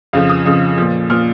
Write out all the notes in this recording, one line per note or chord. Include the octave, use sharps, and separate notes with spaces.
F2 C#3 F3 F5
D#6
F2 C#3 F3
A#2 F3
A#2 F3 F6